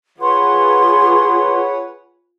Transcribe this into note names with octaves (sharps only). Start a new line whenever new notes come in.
F4 G#4 B4 C#5 F#5 C6